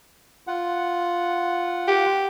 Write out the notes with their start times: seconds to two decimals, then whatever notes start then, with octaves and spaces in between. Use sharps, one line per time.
0.47 F4 F#5
1.88 G4